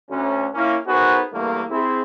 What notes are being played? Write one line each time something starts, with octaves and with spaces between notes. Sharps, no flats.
D2 C#4
A#3 C#4 E4
B3 D#4 F#4 G#4 A#4 C5
E2 G2 A3 A#3
C4 E4 G#4